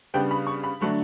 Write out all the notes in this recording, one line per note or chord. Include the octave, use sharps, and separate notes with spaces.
C#3 G3 B3 D4 G5
B5
C#6
B5
D3 F#3 A3 D4